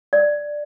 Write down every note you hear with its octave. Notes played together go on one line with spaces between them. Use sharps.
D5